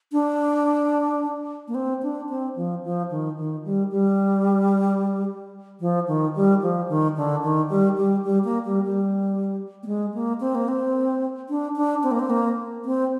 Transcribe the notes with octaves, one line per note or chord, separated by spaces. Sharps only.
D4
A#3
C4
D4
C4
F3
F3
D#3
D#3
G3
G3
F3
D#3
G3
F3
D#3
D3
D#3
G3
G3
G3
A#3
G3
G3
A#3
G#3
A#3
C4
A#3
C4
D4
D4
C4
A#3
C4
A#3
C4